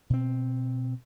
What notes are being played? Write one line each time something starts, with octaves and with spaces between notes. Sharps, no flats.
B2 C4